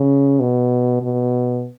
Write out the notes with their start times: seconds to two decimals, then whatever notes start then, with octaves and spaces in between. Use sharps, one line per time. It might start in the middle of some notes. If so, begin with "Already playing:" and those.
Already playing: C#3
0.40 B2
1.02 B2